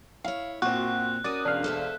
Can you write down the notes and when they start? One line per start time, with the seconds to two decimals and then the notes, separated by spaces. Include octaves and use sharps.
0.24 E4 C#5 F5
0.62 A#2 C4 E4 F#4 F#6
1.24 C#4 F#4 A#4 D5 D#6
1.45 E1 D4 F5
1.64 A4 C5 E5